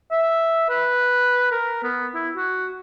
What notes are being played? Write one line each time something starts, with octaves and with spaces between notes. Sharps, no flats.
E5
B4
A#4
B3
E4
F#4